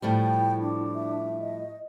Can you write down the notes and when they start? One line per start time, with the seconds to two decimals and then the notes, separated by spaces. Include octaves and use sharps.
0.02 A2 F3 G3 E4 G5
0.61 D4
0.95 E5
1.40 D#5